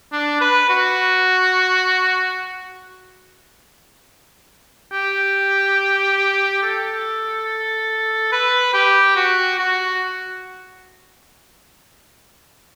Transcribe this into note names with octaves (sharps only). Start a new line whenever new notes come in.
D4
B4
F#4
G4
A4
B4
G4
F#4
F#4